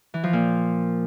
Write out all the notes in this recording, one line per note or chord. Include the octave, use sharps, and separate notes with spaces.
E3
F3
A#2